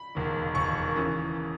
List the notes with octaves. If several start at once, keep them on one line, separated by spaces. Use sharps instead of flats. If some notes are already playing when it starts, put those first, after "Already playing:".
Already playing: B5
E1 D#2 D#3
E1 D#2 D#3 C#6
C#3 E3